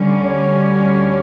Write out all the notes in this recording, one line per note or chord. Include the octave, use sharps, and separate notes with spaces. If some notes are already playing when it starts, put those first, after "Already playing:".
Already playing: D2 D3 G3 C#4
C#5